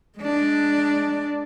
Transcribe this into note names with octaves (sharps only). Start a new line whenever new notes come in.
G#3 D4